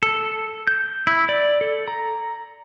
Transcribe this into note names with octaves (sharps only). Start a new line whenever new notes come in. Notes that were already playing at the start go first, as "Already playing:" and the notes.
A4
G6
E4
D5
A4
A#5